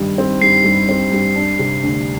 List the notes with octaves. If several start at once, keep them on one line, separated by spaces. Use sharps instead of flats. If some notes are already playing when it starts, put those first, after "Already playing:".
Already playing: G2 D#3 G3
C4
G2 C7
G2
C4
G2
D4
C3
D2